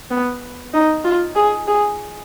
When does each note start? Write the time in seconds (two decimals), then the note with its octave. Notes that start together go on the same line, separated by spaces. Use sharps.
0.10 B3
0.73 D#4
1.04 F4
1.36 G#4
1.67 G#4